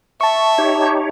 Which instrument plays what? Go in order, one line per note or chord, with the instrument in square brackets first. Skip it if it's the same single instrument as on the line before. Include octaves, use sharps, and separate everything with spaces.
[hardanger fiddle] E5 [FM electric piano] A5 C#6
[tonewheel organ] D#4 G4 C#5